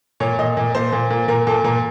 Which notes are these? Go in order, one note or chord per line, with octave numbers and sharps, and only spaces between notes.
A#2 C#5
A#2 D#5
A#2
A#2 C5
A#2
A#2
A#2 A#4
A#2 A4
A#2 A#4